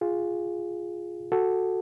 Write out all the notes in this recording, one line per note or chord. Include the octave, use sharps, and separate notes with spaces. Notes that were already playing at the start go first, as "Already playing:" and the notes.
F4 G#4
F#4 A4